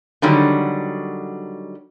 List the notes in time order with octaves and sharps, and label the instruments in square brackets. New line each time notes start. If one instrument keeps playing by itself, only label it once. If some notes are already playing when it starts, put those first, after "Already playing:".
[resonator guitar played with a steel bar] D3 D#3 F#3 G3 C#4